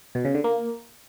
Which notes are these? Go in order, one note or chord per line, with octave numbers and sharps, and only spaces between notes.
B2
C#3
D3
A#3